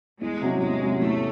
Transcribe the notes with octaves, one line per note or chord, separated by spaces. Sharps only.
E2 G#3
C3 F#3 C#4
E2 G#3
C3 F#3 C#4
E2 A3